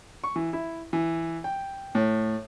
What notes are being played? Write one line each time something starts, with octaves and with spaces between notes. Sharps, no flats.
C#6
E3
E4
E3
G5
A2